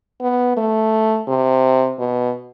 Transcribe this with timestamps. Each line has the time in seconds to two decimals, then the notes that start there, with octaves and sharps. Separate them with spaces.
0.21 B3
0.57 A3
1.28 C3
1.99 B2